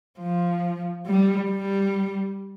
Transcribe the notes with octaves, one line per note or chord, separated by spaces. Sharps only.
F3
G3
G3